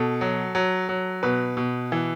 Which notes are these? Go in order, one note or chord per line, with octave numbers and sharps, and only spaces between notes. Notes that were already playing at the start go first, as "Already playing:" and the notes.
Already playing: B2 A4
F#3
F#3
F#3
B2 B4
B2
E3